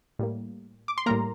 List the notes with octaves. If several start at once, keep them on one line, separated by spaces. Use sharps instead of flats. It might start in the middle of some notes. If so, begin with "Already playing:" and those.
A2 G3 A#3
D6
C6
A2 G3 A#3 A#4 A#5